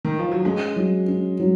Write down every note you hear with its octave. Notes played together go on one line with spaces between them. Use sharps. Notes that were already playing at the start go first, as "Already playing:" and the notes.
D#3
F3
F#3
G#3 C#4
F#3
C#4
F#3